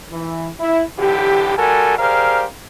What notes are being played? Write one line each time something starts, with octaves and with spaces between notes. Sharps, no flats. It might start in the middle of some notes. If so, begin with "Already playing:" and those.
E3
E4
B1 D3 E3 G4
G3 F#4 A4 A#4 G#5
G4 G#4 A#4 C5 D5 F5